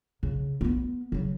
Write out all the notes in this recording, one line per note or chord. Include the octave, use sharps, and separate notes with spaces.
C#3
A#3 B3
C#3 F#3